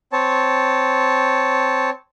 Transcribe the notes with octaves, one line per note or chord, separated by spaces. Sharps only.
C4 C#5 A5